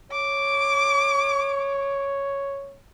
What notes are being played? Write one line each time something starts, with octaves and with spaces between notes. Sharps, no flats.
C#5 D6